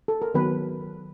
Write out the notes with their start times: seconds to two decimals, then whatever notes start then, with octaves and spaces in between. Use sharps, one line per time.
0.08 A4
0.22 A#4
0.34 D#3 F#3 B3 B4